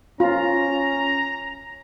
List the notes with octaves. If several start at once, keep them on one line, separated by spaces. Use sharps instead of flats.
C#4 F4 A#5